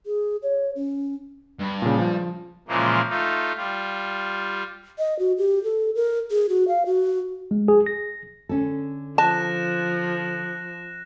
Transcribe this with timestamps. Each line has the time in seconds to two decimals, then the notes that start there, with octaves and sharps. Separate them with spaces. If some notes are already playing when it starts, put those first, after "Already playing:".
0.06 G#4
0.43 C#5
0.75 C#4
1.59 G2
1.82 A#2 C#3
1.98 F3
2.68 A#2 C#3 E3 F3 G#3 A#3
3.10 A3 D#4 F4
3.57 G3 F4
4.99 D#5
5.19 F#4
5.38 G4
5.64 A4
5.95 A#4
6.31 G#4
6.49 F#4
6.68 F5
6.86 F#4
7.51 G#3
7.68 G#4
7.86 A#6
8.49 D3 C#4 A4
9.18 F3 A5 F#6 A#6 E7